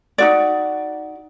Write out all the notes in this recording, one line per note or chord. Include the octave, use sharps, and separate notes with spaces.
D#4 F#4 D5